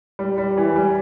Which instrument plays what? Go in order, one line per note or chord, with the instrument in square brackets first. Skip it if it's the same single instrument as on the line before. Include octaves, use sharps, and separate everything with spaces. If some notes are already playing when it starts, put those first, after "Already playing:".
[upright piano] G3
G3
E3
G3